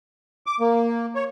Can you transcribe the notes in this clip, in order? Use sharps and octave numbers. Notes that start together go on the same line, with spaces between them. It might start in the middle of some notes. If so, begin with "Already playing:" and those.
D6
A#3
C#5